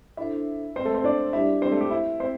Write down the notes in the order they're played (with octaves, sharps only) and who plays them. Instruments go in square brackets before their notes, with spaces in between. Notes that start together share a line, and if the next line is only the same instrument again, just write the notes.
[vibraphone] D4 A4 C5 [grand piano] E4 E5
[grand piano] C4 C5
A3 A4
C4 C5
D4 D5
[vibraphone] G3 D4 G4 D5 [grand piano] E4 E5
[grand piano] C4 C5
A3 A4
G4
E4
C4 C5